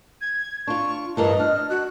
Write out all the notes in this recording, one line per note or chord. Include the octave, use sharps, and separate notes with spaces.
G#6
D4 F4 C#6
E2 G2 A#4 D#5 A5
D4 F6
F#4 F#6